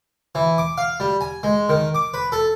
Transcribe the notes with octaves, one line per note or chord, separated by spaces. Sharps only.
E3
D6
F5
G3
G#5
G#3
D#3
D6
B4
A4